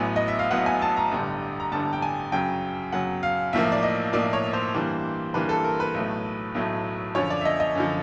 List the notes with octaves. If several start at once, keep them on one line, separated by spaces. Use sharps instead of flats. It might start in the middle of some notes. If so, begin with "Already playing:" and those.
Already playing: A1 A2 F#3 B3 G#5
D#5
E5
F5
A1 A2 F#3 B3 F#5
G#5
A5
A#5
A1 G2 D3 G3
A#5
A1 G2 D3 G3 A5
G5
G#5
F#2 C#3 F#3 G5
F#2 C#3 F#3 F#5
F5
B1 A2 F3 A#3 E5
D5
D#5
B1 A2 F3 A#3 D5
C#5
C5
G2 E3 G3 A#3
G2 E3 G3 A#3 B4
A4
A#4
B4
B1 A2 F#3 A3
B1 A2 F#3 A3
F#2 D3 F3 C#5
D5
E5
D#5
D#5
F#2 D3 F3